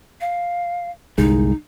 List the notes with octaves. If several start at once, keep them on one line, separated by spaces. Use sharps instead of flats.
F5
G1 C2 G#3 D#4